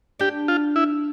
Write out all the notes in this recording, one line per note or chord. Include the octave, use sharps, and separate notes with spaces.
D4 G4
F4
E4